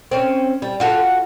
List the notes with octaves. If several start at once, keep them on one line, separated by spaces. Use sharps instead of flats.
C4 C#4
G3
F4 F#4 A4